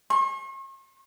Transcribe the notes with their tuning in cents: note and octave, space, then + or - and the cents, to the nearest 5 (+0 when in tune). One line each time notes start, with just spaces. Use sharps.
C#6 -45